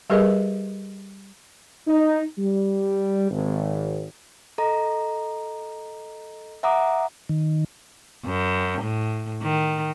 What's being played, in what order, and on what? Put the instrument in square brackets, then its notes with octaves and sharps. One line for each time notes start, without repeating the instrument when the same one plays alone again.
[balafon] G3 G4 G#4 A#4 B4 D#5
[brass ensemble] D#4
G3
G#1
[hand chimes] A4 D#5 A#5
E5 F#5 A#5 D6 D#6
[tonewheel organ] D#3
[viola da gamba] F#2
A2
D#3